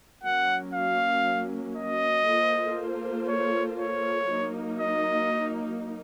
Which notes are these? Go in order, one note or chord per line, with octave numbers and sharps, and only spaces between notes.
F#3 A#3 C#4 F#5
F5
D#5
A#3 F4 A4 C5
C#5
C#5
F#3 A#3 D#4
D#5